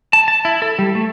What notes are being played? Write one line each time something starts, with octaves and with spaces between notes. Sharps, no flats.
A5
A5
E4
A4
G3
A3